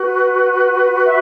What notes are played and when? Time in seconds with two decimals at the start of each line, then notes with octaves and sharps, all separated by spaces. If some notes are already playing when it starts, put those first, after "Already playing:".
Already playing: F#4 B4
1.04 E5